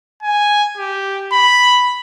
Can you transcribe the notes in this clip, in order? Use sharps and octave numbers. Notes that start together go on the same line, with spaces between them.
G#5
G4
B5